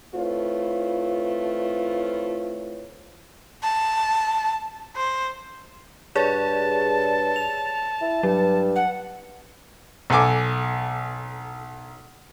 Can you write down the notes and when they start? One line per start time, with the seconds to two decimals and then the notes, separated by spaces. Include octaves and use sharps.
0.14 A3 C4 E4 F4 B4 C#5
3.63 A5
4.97 C5
6.15 G2 G#4 C#5 D5 A5
7.36 F7
8.01 E4
8.23 G2 F#3
8.76 F#5
10.10 B1 A4 G#5 D6